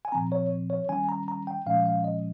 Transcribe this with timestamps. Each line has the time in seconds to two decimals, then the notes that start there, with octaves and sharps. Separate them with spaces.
0.05 G#5
0.12 A#2 F3 C4 A#5
0.32 C#5
0.70 C#5
0.89 D#3 G3 C#4 G#5
1.09 A#5
1.28 A#5
1.47 G5
1.66 A#2 F3 G#3 C#4 F5
1.86 F5
2.04 D#5